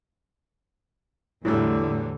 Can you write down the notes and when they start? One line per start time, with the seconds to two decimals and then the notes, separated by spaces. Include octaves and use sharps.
1.45 E2 A2 D3 E3 F#3 G3 E4 E6